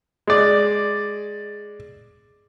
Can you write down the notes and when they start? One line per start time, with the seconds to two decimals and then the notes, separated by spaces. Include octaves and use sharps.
0.27 G#3 D5